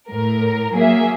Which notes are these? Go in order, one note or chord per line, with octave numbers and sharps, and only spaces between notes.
A2 A#4
F#3 A#3 G#4 E5